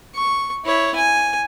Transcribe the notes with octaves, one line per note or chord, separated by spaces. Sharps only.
C#6
E4 C#5
G#5